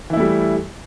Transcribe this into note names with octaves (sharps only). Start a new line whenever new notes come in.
E3 G3 A3 E4